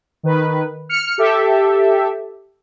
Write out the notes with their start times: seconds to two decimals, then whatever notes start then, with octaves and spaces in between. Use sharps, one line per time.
0.23 D#3 B4
0.89 F6 C#7
1.18 G4 A4 E5